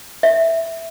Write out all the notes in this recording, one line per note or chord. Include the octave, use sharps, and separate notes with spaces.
E5